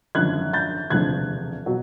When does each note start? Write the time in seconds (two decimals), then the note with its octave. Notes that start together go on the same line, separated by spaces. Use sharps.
0.15 G#1 F#2 D3 F3 F#6 G#6
0.53 G6 A6
0.90 E1 D2 C3 F3 F#6 G#6
1.66 B2 F#3